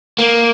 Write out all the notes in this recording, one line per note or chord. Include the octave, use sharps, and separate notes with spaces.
A#3